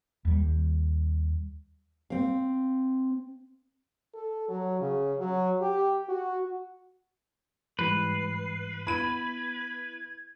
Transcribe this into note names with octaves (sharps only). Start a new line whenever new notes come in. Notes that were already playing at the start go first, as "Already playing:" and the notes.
D#2 G3
C4 F5
A4
F#3
C#3
F#3
G4
F#4
G#2 E3 G3 B4 C7
B3 E4 B5 G#6 D#7